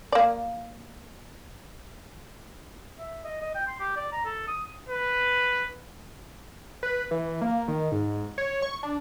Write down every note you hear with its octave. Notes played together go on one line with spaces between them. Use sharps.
A#3 D5
E5
D#5
D#5
G5
C6
G4
D5
A#5
A4
D#6
B4
B4
E3
A#3
D#3
G#2
C#5
C#6
D4